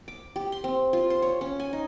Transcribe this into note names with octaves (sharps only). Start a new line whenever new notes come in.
D6
G4
C6
C4
F4
C5
C#5
C#4
G#5
D#4